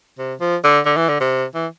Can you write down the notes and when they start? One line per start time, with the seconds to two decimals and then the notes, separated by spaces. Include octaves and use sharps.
0.18 C3
0.40 F3
0.64 D3
0.86 D3
0.97 E3
1.09 D3
1.21 C3
1.55 E3